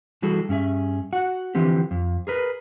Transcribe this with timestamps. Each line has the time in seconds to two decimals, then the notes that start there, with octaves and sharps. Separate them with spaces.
0.22 E3 G3 F#4 G#4 A4
0.49 G2 C#4 G#4 E5
1.13 F#4 F#5
1.55 D3 E3 F3 C4 G4
1.91 F2
2.27 G#4 A#4 B4